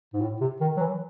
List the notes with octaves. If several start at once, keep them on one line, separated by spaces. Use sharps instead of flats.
G#2
A2
C3
D#3
F#3
E3